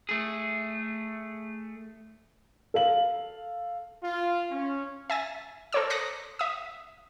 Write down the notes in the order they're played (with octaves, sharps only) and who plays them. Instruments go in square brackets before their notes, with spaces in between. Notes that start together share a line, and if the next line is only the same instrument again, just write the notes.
[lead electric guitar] A3 G#4
[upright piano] A4 F5 F#7
[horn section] F4
C#4
[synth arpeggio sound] E5 G#5 A6
A4 A#4 C5 C#5 D6 E6
D6 D#6 F#6 A#6 B6 C#7
E5 D#6